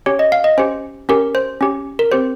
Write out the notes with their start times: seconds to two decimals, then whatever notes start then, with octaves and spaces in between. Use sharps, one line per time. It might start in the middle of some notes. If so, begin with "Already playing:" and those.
0.06 C#4 G4 C#5
0.19 D#5
0.32 F5
0.44 D#5
0.58 C#4 G4 C5
1.09 C#4 G4 A#4
1.35 C5
1.61 C#4 G4
1.99 A#4
2.12 C4 G4 C5